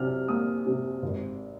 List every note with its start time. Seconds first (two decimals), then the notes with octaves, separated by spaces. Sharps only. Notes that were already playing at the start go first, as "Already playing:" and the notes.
Already playing: C3 F#3 F6
0.28 A#3 D#6
0.66 C3
1.02 G#1